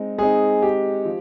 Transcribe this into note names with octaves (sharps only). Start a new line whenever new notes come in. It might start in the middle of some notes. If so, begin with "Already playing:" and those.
Already playing: G#3 C4 D#4
G#3 C4 D#4 G#4
G4
F3